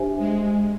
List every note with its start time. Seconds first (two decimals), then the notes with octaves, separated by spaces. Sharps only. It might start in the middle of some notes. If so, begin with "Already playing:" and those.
Already playing: D4 G4 C5 E5 G#5
0.18 G#3